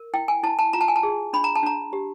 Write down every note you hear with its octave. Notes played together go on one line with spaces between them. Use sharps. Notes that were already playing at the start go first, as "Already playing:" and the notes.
Already playing: A#4
E4 G5
G#5
E4 A5
A5
F4 A#5
A5
G#5
A5
G#4
D4 B5
A#5
A5
D4 A#5
G4